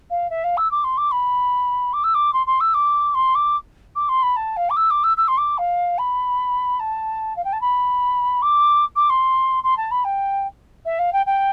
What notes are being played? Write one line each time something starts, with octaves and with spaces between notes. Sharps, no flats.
F5
E5
F5
E6
D6
C6
D6
B5
D6
E6
D6
C6
C6
E6
D6
C6
D6
D6
C6
B5
A5
F5
D6
E6
D6
E6
E6
C6
D6
F5
B5
A5
F5
G5
A5
B5
D6
D6
C6
C6
A5
B5
G5
E5
F5
G5
G5